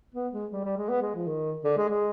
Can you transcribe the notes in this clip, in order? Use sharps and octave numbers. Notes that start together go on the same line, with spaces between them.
B3
G#3
G3
G3
G#3
B3
G#3
F3
D#3
D3
G#3
G#3